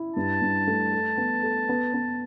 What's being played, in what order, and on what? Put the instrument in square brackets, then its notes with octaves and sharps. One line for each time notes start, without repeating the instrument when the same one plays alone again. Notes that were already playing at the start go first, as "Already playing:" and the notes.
Already playing: [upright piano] E4
[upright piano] G2 [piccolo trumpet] A5
[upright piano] G2
A3
A4
B3
A4
B3
B3